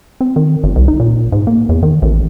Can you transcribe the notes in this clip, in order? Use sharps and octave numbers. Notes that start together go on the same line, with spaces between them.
C4
D#3
G1
C2
D#4
A#2
G#2
A#3
E2
D#3
A1